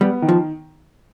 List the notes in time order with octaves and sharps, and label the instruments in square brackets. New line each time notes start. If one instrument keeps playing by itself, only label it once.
[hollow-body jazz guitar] G3 [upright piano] B3
[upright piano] D#3
[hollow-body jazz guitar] F3